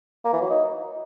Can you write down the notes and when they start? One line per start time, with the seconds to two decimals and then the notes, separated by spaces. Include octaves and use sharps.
0.25 A#3
0.33 E3
0.42 F#3
0.50 D#4